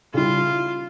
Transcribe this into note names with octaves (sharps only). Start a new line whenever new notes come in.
C#3 G3 C#4 E4 F4